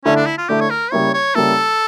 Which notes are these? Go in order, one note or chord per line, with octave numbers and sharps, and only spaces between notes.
D3 A3 C#4 E4
D4
E4
F4
D3 A3 E4 G4
C#5
A#4
C#3 G3 A#3 E4 C#5
C#5
C#3 G3 A#3 E4 A4